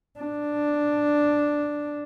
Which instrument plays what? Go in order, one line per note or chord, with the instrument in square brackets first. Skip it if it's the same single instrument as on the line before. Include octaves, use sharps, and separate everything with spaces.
[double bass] D4